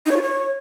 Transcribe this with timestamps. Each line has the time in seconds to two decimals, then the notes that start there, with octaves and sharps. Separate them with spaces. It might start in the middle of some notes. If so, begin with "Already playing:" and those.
0.06 D#4
0.11 C#5
0.16 F4
0.22 C#5